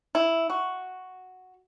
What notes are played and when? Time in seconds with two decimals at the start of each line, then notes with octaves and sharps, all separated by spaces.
0.15 E4
0.50 F#4